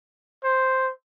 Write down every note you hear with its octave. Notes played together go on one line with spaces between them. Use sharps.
C5